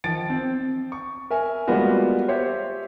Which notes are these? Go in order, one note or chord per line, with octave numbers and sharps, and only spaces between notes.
D#3 F3 A6 D7
C4
C#6
A#4 E5 G#5
G3 G#3 A#3 B3 F4 F#4
G4 C5 C#5 E5